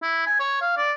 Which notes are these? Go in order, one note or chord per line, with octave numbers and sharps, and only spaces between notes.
E4
G#5
C#5
F5
D5